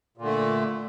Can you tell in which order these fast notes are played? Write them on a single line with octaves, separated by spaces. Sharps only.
A#2 D3 A3